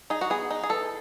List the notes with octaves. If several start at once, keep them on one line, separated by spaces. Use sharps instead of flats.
D#4 G#4
F#4
B3 G#4
D#4
G#4
E3 A4